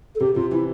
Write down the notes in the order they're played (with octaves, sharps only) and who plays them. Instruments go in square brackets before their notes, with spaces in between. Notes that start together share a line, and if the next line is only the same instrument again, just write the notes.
[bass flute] A4
[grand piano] C3 [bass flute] G4
[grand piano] C3 [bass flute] F4
[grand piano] E3 [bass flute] E4